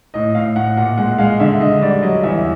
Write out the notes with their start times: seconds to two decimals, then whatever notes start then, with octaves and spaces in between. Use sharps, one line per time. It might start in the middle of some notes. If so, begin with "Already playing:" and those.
0.14 A2 D#5
0.35 A2 F5
0.56 A2 F#5
0.77 A#2 F#5
0.98 G#3 F#5
1.18 G#3 F5
1.40 D3 E5
1.61 D3 D#5
1.82 G3 D5
2.02 F#3 D#5
2.23 E2 E5